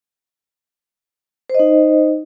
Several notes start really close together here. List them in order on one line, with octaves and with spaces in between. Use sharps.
C5 D#5 D#4